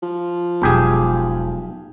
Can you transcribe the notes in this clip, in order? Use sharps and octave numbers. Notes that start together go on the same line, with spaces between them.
F3
E1 B1 G4 G#4